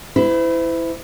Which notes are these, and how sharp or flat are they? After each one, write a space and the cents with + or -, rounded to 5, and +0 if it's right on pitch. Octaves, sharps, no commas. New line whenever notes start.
E4 +0 C5 -45